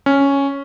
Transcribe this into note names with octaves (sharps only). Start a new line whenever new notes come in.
C#4